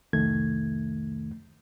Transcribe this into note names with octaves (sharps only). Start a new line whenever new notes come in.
C2 F2 D#3 A3 G#6